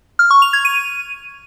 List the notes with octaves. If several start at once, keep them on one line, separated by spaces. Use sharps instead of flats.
F6
C#6
F7
G#6
D#7